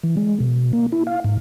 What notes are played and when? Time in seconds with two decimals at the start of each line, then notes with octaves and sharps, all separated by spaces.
0.03 E3
0.17 G#3
0.40 B2
0.73 A#3
0.92 E4
1.07 F5
1.24 G#2